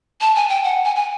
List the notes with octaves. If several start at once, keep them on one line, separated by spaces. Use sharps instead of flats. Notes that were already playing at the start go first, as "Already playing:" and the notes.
A5
G#5
G5
F#5
G#5
G#5